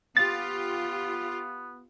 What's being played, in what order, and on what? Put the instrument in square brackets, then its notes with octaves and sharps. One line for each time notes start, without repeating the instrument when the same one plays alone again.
[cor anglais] B3 [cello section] F4 G4 [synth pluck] A6